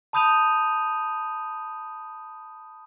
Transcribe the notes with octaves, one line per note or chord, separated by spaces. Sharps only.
A5 B5 D#6 G6 D#7 F7